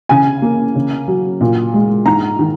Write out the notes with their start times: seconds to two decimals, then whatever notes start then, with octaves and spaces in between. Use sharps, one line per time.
0.09 C#3 G#5
0.42 A#3
0.76 C#3
1.08 F#3
1.41 A#2
1.74 G#3
2.06 G#2 A#5
2.39 D#3